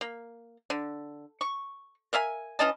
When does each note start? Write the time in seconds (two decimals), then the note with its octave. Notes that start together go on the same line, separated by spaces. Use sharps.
0.01 A#3
0.70 D3
1.41 C#6
2.13 A#4 E5 F5 G#5
2.59 E3 C#4 D#5 A5